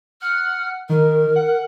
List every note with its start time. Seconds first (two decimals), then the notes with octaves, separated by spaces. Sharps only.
0.22 F#5 F6
0.89 D#3 A#4
1.36 F#5